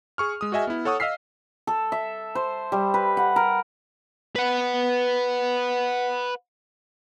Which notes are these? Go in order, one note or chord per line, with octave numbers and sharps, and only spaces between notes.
G#4 C#6 F6
G#3 D#6
F#4 G#4 D#5 E5 G#5
B3 E4
A4 C#5 F#5 C#6 D#6
D#5 F5 E6 F6 B6 C7
A4
E5
C5
G3
B4
F#5
A#4
B4 F#5